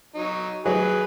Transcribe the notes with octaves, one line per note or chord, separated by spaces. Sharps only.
F#3 D#4
F#3 G#4 B4